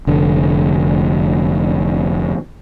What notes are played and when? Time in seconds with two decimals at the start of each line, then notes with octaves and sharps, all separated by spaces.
0.07 F1 D3